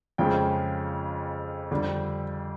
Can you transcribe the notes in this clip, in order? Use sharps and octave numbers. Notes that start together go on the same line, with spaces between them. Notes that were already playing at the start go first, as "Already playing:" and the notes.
F2 C#3 F3 G#3 G5
F2 D3 G3